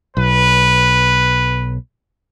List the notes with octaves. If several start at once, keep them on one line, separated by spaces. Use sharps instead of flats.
B1 B4